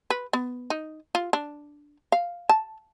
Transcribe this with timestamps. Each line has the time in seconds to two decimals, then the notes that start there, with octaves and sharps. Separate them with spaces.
0.10 B4
0.33 B3
0.70 D#4
1.15 F4
1.33 D4
2.12 F5
2.49 A5